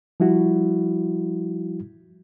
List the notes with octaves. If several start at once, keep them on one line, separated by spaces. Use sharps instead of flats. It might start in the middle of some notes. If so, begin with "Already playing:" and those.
F3 G3 E4 F#4